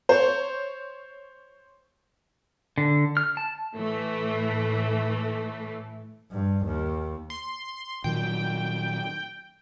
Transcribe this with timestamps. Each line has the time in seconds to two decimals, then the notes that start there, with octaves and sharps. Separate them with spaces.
0.09 C5 C#5
2.78 D3
3.17 F6
3.37 A5
3.74 A2 E3 A3
6.31 G2
6.66 D#2
7.30 C6
8.04 A#2 D#3 F#3 G5